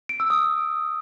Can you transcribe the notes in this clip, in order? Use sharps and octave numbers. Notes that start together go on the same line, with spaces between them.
D7
E6
D#6